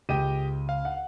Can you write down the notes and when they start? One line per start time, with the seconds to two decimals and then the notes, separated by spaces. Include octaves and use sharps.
0.09 C#2 G4 D#5 G5 D#7
0.69 F5
0.85 F#5